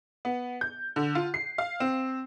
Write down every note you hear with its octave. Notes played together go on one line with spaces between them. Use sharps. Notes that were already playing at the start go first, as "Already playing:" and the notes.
B3
G6
D3
F4
C7
F5
C4